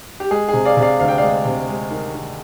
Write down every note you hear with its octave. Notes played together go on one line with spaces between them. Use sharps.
G4
G#3 G#4
G#4
C3
D5 F5
C3
D5 F5
D2 F5
G5
G#3 D5 F5
C3
G#3
D#3
D#3